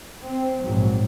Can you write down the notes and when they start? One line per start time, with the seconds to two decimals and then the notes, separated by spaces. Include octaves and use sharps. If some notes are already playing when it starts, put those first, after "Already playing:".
0.24 C4
0.62 A#1 G#2 F#3